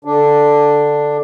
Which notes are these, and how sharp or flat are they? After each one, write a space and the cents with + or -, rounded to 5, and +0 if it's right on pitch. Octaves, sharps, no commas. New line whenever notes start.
D3 +0 D4 +5